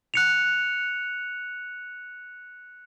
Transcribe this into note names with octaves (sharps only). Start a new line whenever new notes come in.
F#6 C#7 F7